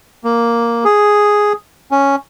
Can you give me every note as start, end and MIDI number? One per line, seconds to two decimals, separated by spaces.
0.24 0.84 58
0.85 1.53 68
1.91 2.16 61